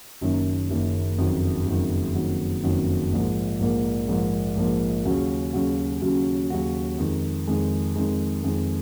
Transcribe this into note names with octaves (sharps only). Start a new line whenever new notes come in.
F#1 F#2 D#3 A#3
F#1 F#2 D#3 A#3
F#1 F2 D#3 F#3
F#1 F2 D#3 F#3
F#1 F2 D#3 F#3
F#1 F2 D#3 F#3
A#1 G#2 F3 A#3
A#1 G#2 F3 A#3
A#1 G#2 F3 A#3
A#1 G#2 F3 A#3
D#2 C#3 F#3 C#4 F#4
D#2 C#3 F#3 C#4 F#4
D#2 C#3 F#3 C#4 F#4
D#2 C#3 F#3 C#4 F#4
F2 D#3 G#3
F2 D#3 G#3
F2 D#3 G#3
F2 D#3 G#3